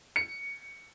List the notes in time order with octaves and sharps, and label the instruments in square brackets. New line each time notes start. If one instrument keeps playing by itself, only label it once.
[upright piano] C#7